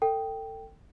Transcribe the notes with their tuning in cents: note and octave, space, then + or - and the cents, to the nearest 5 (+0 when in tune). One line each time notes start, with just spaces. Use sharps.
A4 +30 G5 +0